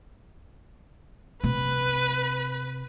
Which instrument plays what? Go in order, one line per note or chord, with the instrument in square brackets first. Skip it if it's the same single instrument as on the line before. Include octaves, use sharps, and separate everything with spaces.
[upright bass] C3 [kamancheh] B4